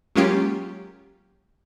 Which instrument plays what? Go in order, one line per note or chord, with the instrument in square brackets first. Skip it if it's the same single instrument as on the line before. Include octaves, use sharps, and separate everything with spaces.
[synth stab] F#3 G#3 A#3 C#4 F4 G4